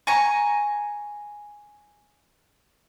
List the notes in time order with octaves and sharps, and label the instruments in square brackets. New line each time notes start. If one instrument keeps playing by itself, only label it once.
[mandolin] G#5 A#5 C#6